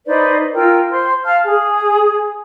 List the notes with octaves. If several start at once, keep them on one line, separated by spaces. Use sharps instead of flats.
D#4 B4 C5 D5
F4 A#4 G5 E6
C5 C6
F5 A5 F6
G#4